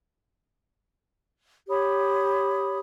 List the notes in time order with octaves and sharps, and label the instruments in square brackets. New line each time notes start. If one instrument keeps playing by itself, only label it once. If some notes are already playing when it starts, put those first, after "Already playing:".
[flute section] G4 C#5 B5 D#6